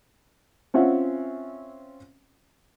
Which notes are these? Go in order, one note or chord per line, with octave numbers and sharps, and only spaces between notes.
C4 C#4 F4 E5 F#5